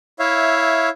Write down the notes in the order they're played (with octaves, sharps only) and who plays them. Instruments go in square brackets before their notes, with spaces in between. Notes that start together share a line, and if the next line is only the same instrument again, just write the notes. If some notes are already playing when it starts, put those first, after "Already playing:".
[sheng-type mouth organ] E4 C#5 E5 F5